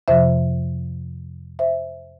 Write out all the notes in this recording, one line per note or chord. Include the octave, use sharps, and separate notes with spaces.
F2 C3 F3 C5 E5
C5 E5